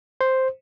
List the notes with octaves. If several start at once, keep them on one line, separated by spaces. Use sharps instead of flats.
C5